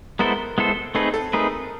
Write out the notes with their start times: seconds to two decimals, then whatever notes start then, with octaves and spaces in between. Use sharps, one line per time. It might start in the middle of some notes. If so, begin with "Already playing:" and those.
0.19 G#3 B3 E4 A4 A#4 C5
0.58 G#3 B3 E4 A4 C5
0.95 A3 C4 D#4 G#4 A4 B4
1.14 A4
1.33 A3 C4 D#4 G#4 A#4 B4